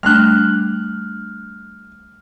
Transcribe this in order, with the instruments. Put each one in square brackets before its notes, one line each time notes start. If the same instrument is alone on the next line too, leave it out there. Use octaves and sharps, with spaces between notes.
[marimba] G3 A3 D4 [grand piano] F6 F#6